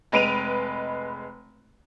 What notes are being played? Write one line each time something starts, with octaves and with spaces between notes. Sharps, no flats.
F1 G#3 B4 D7 D#7 F7